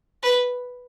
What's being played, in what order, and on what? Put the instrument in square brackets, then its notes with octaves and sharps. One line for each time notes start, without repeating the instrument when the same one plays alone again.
[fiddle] B4